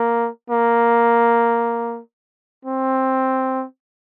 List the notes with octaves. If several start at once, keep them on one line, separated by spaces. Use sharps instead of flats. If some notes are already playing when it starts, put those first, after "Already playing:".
Already playing: A#3
A#3
C4